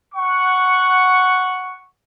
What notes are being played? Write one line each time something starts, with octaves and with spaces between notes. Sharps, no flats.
F#5 C#6